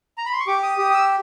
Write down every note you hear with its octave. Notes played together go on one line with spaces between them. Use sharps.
A#5
B5
C6
C#6
G4 D6
D#6
G4 D#6
D#6
E6